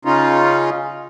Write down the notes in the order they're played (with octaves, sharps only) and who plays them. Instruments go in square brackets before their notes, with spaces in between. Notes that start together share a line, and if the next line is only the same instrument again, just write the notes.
[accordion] C#3 C#4 D#4 F4